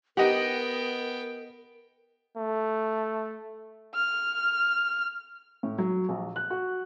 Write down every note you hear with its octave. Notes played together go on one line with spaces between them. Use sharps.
B3 D#4 G4 A#4 D#5 F#5 G5
A3
F6
A2
F#3
A#1
F#6
F#4